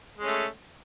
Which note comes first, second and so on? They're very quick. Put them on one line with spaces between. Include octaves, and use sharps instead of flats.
G#3 C#4 A3